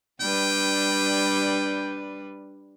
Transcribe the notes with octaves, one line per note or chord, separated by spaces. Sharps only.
G3 D4 B4 G5